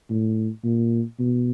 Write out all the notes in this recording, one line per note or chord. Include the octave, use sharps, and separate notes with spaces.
A2
A#2
B2